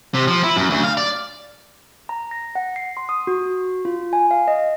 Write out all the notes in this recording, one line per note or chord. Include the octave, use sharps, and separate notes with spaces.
C3
F3
E4
F#2
D2
F5
D5
A#5
A#6
F#5
C7
C6
D#6
F#4
F4
G#5
F5
D#5